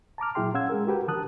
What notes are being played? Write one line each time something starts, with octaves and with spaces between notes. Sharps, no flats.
A5 A#5 D6 F6
A#2 F#3 E4 G#4 G5 C6
C#4 F5 F#5 E6 G#6
G#3 G#4 A#4
F#4 G4 A#4 B4 G5
D3 F3 A#4 A5 D#6 F#6